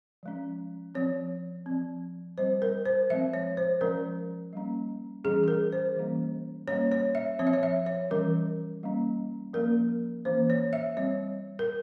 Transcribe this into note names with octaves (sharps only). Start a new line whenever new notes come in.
F3 G#3 C#4
F3 C4 C#5
F3 C4
G3 C4 C5
A#4
C5
F3 G#3 C4 E5
C#5
C5
F3 G#3 C#4 A#4
G3 A#3 C#4
E3 G3 C#4 G#4
G#4
A#4
C5
E3 G3 A#3 C#4
G3 A#3 C#4 C#5
C#5
E5
F3 C4 C#5
E5
C#5
E5
C#5
E3 G3 C#4 A#4
G3 A#3 C#4
F3 A#3 C#4 A#4
E3 A#3 C#4 C5
C#5
E5
G3 C4 C#5
A#4